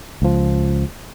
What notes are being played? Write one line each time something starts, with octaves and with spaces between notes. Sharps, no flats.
C#2 F3